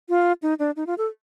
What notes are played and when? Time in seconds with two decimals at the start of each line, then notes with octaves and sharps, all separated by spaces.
0.09 F4
0.42 D#4
0.59 D4
0.76 D#4
0.87 F4
0.98 A4